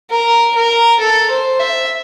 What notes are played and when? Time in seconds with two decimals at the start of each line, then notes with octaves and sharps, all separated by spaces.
0.11 A#4
0.56 A#4
1.00 A4
1.31 C5
1.60 E5